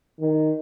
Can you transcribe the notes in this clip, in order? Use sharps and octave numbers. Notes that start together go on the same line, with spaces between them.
D#3